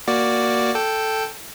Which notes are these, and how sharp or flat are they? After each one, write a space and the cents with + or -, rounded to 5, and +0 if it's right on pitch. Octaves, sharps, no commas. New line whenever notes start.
A#3 +5 F#4 +0 D5 +0
A4 +0 G5 +0